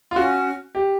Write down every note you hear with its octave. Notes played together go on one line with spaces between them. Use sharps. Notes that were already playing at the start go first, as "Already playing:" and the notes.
F4
C#4 F#4
G4